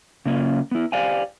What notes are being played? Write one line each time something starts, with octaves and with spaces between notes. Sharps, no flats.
C#3 A#3 C#4 F4
B3 E4
G4 C5 D5 F5 G5 G#5